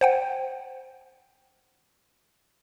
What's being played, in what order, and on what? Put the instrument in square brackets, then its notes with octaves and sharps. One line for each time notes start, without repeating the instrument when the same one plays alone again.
[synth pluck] C5 F#5 G5